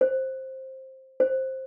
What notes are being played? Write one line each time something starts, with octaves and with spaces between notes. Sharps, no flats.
C5
C5